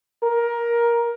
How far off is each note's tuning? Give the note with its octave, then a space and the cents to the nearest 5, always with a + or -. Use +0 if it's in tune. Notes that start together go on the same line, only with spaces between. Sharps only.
A#4 +15